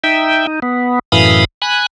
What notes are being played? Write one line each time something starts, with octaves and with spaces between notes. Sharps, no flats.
D#4 E5 G5
D#4
B3
F#2 A2 E3 F5 B5 D#6
G#5 B5 F#6